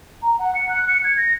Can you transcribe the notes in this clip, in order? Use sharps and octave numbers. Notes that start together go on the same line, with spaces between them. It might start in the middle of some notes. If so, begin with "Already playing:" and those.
A#5
F#5
C#7
F#6
C#7
G#6
A#6